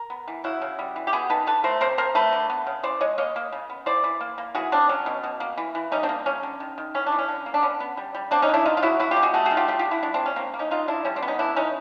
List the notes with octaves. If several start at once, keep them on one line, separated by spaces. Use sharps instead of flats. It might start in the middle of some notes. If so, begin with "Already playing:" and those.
Already playing: A#4
B3
E3
C#3 E4 F#4
C#3
G3
E3
G4
B3 F#4 G#4
D#3 A4 B4
D3 A4 B4
A3 A#4 C5
C3 A#4 C5
C3 A#4 C5
A3 A4 B4
D3
B3
C#3
E3 C5 D5
G#3 C#5 D#5
A#3 C#5 D#5
A#3
C#3
B3
E3 C5 D5
E3
A#3
A#3
E3 F#4 G#4
C#3 C4 D4
F#3 C#4
B2
B2
A#3
E3
E3
G3 C#4 D#4
C4 D4
A#3
G3 C#4
D3
D#3
D#3
E3 C#4
D4
E3
C#4
D3
A#3
D4
B3 C#4
B3
G3
G3
A#3 C4 D4
C#4 D#4
D3
D4 E4
D#3 D#4 F4
F4
F#3 E4 F#4
F#3 E4 F#4
F4 G4
B2
F#4 G#4
A3 F#4 G#4
F#4 G#4
D#3
F4 G4
G3 F4 G4
F4 G4
D3
E4 F#4
G#3 D4 E4
C4 D4
C3
C#4
A#3 C4
A#3
C#4 D#4
D3 D#4 F4
D3 D4 E4
G3 C#4
C4 D4
B3
C#4 D#4
E3 D4 E4
E3 C#4 D#4